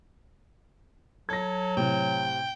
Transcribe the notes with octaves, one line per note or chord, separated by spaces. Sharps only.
F#3 A4 G#6 A#6
A2 C3 G5